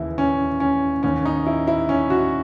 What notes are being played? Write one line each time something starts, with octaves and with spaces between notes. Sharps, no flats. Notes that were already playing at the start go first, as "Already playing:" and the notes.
Already playing: D#2 C#3 E3 E4
C#4
C#4
D#2 D#3 C#4
D#4
E4
E4
C#4
F#4